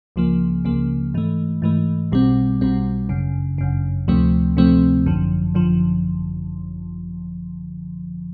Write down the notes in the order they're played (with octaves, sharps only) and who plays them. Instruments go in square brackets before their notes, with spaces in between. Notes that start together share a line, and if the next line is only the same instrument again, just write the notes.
[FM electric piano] C#2 C#3 F3 A#3
C#2 C#3 F3 A#3
G#2 E3 A3
G#2 E3 A3
B1 B2 G3 C4
B1 B2 G3 C4
G1 F#2 C#3
G1 F#2 C#3
D2 C3 F3 A3 C4
D2 C3 F3 A3 C4
G#1 F#2 D3 F3
G#1 F#2 D3 F3